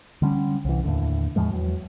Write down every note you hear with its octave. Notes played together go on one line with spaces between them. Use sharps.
D3 G3 C#4
C2 E3
D#2 A2 D3
E2 A2 F3 G#3
E2 F#3